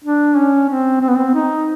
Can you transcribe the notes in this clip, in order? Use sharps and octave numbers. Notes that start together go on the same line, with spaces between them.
D4
C#4
C4
C4
B3
C4
D#4